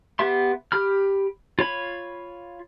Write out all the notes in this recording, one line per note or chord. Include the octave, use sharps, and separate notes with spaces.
B3 G4 E5 C6
G4 B5 F6
F4 C#5 B5